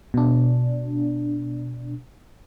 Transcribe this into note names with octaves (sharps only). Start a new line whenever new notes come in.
B2 D4